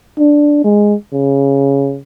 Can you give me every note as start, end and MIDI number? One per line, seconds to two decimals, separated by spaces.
0.19 0.60 62
0.64 0.94 56
1.13 1.98 49